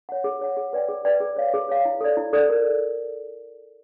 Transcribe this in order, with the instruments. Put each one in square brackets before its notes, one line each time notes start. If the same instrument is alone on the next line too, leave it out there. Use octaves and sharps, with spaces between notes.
[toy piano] C#5 F#5
G#4
C#5 F#5
G#4
B4 D5 G5
G#4
B4 D5 G5
G#4
C#5 F5
G#4
C#5 F5
E4
A4 D5
E4
A4 D5
A#4